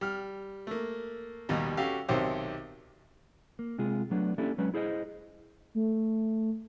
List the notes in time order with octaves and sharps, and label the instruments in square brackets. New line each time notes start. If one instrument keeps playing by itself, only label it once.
[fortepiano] G3 F6
A3 A#3
A#1 D#2 B2 G3 D#5 A#5
C#4 F#4 G4 A4 F5
B1 C3 D#3 G4 C5 C#5
[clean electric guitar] A#3
C3 G#3 F4 G#4
F#3 A3 B3 D4
A#3 C#4 D4 E4 G4 A4
F#3 G#3 C#4 B4
E4 G#4 C5 D5 D#5
[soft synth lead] A3